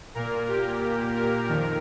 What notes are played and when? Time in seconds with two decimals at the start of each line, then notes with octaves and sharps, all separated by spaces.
0.15 A#2 A#3 A#4
0.49 G4
1.16 A#4
1.49 F2 D#3